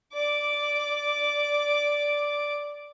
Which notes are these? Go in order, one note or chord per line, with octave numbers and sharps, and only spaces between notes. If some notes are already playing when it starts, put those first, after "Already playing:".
D5 D6